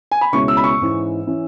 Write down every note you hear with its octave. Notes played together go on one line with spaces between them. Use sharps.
G#5
B5
C#2 B2 G#3 C#4 E4 C#6
E6
B5
C#6
G#2 E3 C#4 E4
E3 C#4 E4